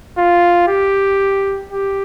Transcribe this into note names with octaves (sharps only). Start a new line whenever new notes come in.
F4
G4
G4